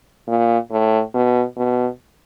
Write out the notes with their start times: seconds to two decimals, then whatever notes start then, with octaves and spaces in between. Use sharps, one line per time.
0.28 A#2
0.71 A2
1.14 B2
1.57 B2